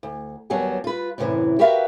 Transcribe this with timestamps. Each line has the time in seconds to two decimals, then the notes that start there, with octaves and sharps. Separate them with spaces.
0.03 D2
0.50 D#2 F#3 G3 B3 G#5 A5
0.84 F4 B4
1.18 F#2 A2 C3 D#3 E3
1.59 F#4 G4 A#4 B4 E5 F5